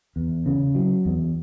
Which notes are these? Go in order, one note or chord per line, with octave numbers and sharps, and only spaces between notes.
E2
C#3
F#3
E2